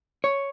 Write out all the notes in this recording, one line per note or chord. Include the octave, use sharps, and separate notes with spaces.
C#5